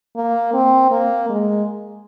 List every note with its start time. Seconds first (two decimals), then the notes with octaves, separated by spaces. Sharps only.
0.16 A#3
0.54 C4
0.91 A#3
1.29 G#3